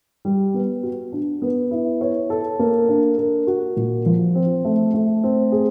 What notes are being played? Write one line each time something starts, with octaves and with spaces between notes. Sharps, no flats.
G3
B3
F#4
D4
B3
E4
C#5
A4
A#3
D4
A#4
F#4
A#2
F3
C4
A3
A3
C4
G#4